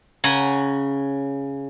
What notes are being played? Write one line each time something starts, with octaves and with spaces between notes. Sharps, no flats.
C#3 C#5 F#5 G#5 A#5